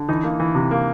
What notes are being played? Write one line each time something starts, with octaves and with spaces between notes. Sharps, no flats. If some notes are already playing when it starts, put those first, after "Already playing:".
Already playing: D3
E3 D#4
A#3
E3
C3
A#3